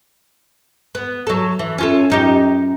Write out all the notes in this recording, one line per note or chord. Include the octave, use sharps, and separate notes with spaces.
B3
F#3 A4
E3
C#4 F4 A4
F#2 D#4 G4